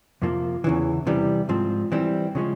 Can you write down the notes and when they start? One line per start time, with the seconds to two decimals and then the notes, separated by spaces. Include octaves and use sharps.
0.22 F2 C3 F3 A#3
0.64 E2 C#3 E3
1.07 C3 E3 G3
1.49 G#2 F3 C4
1.92 E3 G3 C4
2.35 C#3 F3 G#3 C#4